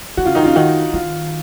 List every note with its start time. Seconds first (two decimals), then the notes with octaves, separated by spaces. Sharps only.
0.17 D#3 F#4
0.25 C#3 F4
0.35 D#3 D#4
0.43 C#3 F4
0.56 D#3 F#4
0.93 D#3 F4